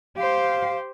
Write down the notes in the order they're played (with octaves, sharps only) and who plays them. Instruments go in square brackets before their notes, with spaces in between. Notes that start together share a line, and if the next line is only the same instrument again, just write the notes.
[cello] G4 C5 [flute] F5